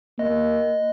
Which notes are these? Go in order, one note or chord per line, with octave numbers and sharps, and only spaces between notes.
A#3 D#5